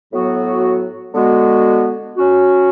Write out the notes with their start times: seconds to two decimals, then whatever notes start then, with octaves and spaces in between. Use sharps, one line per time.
0.12 A2 F#3 B3 F#4
1.14 D3 G#3 B3 F#4
2.16 F#3 C#4 F#4